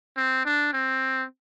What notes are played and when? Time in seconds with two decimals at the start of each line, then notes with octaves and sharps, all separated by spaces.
0.16 C4
0.45 D4
0.73 C4